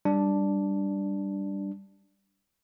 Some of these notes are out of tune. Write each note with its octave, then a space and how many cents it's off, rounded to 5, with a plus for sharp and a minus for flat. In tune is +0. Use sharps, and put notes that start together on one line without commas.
G3 +0 D4 +0